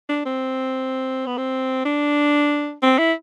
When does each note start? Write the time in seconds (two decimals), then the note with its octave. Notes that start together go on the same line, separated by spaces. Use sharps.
0.09 D4
0.26 C4
1.26 B3
1.37 C4
1.85 D4
2.83 C4
2.98 E4